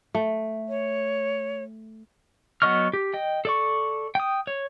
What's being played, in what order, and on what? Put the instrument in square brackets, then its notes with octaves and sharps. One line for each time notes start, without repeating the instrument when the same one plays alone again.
[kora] A3
[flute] C#5
[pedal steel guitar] F#3 B3 D#5 C#6 F6
G4
D#5 G5
A4 D5 C#6
G5 D#6
C#5